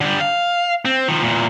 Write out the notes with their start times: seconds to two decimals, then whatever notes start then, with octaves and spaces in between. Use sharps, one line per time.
0.01 D3 G3
0.20 F5
0.85 C4
1.08 D#3 F3
1.22 E2 A#2